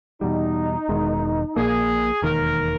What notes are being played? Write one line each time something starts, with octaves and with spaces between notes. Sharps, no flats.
E2 B2 G3 D#4
E1 E2 D#3 G#3
A#1 A#2 A#3 G#4
E1 D#2 D#3 A#4